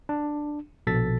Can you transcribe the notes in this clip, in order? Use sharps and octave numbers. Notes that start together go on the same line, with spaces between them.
D4
A#1 B2 A4 A6 B6